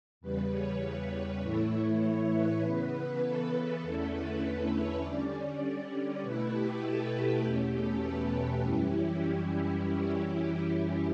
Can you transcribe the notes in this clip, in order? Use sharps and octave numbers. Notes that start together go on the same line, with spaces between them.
E2 C#3 G3 B4
C#5
A2 E3 A3 E4
C#5
B4
C#3 E3 B3
A4
B4
E2 D3 A3 C#4 E4 A4
B4
A4
C#5
D3 G3 C#4 D5
B2 A3 E4 B4
G4
A4
G4
E2 B2 A3 C#4 G4
A4
B4
G4
F#2 E3 G3 C#4 E4